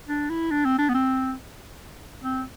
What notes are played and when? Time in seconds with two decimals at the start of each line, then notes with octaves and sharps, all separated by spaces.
0.09 D4
0.30 E4
0.51 D4
0.65 C4
0.79 D4
0.89 B3
0.94 C4
2.24 C4